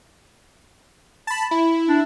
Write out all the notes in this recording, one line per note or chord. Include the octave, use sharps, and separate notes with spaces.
A5 B5
E4 B5
D4